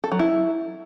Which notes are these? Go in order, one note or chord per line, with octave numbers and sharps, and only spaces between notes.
A4
F#3
E4